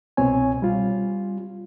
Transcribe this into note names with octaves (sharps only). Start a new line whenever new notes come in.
C2 B2 C4 C#5 G#5
G3 F4